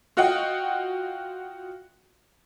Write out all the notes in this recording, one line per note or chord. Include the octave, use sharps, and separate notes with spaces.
F4 F#4 D#5 F#5 G5